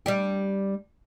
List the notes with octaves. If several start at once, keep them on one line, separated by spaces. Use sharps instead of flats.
G3 D4 G4